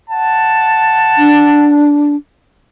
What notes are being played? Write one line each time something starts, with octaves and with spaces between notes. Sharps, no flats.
F#5 A5
D4